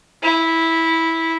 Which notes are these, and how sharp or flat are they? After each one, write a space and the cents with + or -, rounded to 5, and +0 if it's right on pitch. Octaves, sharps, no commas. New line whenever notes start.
E4 -10